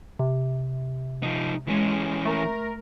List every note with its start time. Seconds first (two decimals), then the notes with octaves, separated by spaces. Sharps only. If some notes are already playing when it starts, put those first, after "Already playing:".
0.19 C3
1.23 F3 D#4
1.67 E3 G#3 C#4
2.26 A3 A#4